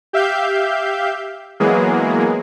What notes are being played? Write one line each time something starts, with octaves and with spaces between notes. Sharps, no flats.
G4 E5 F5 G6
E3 F#3 G#3 A#3 B3 G#4